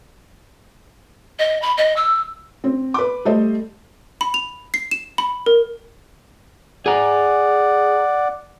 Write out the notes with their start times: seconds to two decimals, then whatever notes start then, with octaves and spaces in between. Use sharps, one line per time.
1.39 D#5
1.62 B5
1.78 D#5
1.96 E6
2.64 C4
2.94 B4 D6
3.25 G3 A3 A4 C5 D#5
4.21 B5
4.34 F7
4.74 C7
4.91 E7
5.18 B5
5.46 A#4
6.86 G#4 D5 F#5 A#5